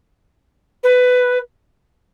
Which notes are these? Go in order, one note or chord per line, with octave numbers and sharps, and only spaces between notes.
B4